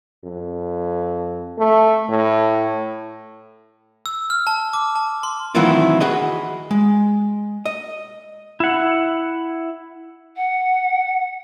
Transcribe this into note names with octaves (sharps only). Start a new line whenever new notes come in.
F2
A3
A2
E6
F6
A5
D6
A5
C6
D#3 E3 F#3 C4 E4 F4
F#4 G#4 B4 D#5
G#3
D#5
E4 F#5
F#5